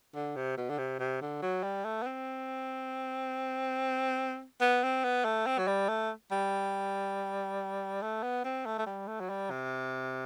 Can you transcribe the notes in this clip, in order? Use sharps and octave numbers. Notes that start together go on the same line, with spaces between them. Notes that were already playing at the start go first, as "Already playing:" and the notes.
D3
C3
B2
D3
C3
C3
D3
F#3
G3
A3
B3
C4
B3
C4
B3
A3
C4
F#3
G3
A3
G3
A3
B3
C4
A3
A3
G3
A3
F#3
G3
C3